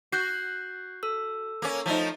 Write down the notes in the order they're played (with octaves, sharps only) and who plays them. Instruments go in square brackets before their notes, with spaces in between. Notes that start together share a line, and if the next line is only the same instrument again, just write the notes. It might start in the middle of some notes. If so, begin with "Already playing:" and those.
[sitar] F#4 [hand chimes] F#6 G6 C7
[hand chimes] A4 E6
[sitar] A#3 C#4
F3 A3 D#4